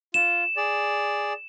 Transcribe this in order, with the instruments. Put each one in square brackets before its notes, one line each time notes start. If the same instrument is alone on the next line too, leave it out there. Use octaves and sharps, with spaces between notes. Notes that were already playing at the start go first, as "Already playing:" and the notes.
[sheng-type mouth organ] F4 [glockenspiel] E7
[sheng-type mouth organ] G#4 D5